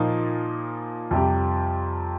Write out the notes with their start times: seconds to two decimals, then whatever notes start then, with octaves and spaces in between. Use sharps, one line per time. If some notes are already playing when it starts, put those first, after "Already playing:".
Already playing: A#2 F3 A#3 D#4
1.11 F2 C3 G3 C4 G4